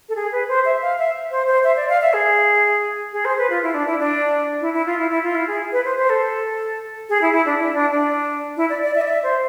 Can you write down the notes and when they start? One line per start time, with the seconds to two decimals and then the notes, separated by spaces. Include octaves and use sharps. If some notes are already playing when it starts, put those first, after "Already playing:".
0.09 A4
0.16 G#4
0.32 B4
0.48 C5
0.65 E5
0.82 F5
0.99 E5
1.31 C5
1.47 C5
1.64 E5
1.76 D5
1.89 F5
2.01 E5
2.13 G#4
3.13 G#4
3.25 C5
3.38 B4
3.50 F4
3.63 E4
3.74 D4
3.87 E4
3.99 D4
4.61 E4
4.74 E4
4.86 F4
4.99 E4
5.11 E4
5.23 F4
5.35 E4
5.48 G#4
5.72 B4
5.85 C5
5.97 C5
6.10 A4
7.09 G#4
7.22 E4
7.33 E4
7.46 D4
7.59 E4
7.74 D4
7.91 D4
8.57 E4
8.70 D5
8.83 D5
8.95 E5
9.01 D5
9.07 E5
9.23 C5